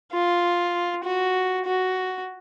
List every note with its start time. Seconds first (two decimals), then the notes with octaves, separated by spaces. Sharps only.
0.12 F4
1.04 F#4
1.66 F#4